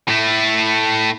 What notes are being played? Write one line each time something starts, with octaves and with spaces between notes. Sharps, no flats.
A2 A3